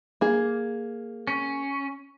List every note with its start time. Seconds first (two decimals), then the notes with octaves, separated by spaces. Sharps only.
0.21 A#3 G#4
1.27 C#4